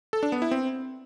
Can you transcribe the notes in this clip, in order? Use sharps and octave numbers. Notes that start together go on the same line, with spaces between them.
A4
D4
B3
E4
C4